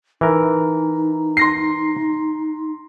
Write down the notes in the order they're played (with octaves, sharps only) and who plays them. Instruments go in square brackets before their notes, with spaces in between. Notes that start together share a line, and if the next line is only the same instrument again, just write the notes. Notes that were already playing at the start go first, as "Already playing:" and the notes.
[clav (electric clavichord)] E3 A#4 [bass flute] D#4
[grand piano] C6 A#6 C7